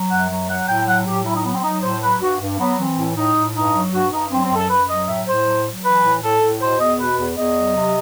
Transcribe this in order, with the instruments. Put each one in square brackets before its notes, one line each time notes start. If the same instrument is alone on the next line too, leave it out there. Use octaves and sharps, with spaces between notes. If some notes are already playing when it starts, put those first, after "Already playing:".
Already playing: [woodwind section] F#3
F#2 F#5
F#3
F#3 F#5
A2 G5
F#3 F#5
A2 G4
F#3 E4
D#4
F#3 B3
C4
F#3 D#4
A2 C5
F#3 B4
G2 F#4
G2
F#3 B3
E3 C4
A2
A2 D#4
A2
G2 D#4
F#3
G2 F#4
G2 D#4
F#3 C4
C4
F#2
A4
F#2 B4
F#3 D#5
A2 E5
A2 C5
F#3
F#3
E3 B4
A2
A2 A4
A2
B2 C5
E2 D#5
B2 B4
E2 B4
E2 D#5
F#3
C3